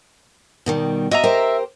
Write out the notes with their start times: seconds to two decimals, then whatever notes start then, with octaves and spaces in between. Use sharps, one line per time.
0.66 B2 D#3 G3
1.11 F#4 D#5 E5 A#5
1.24 G4 A#4 C5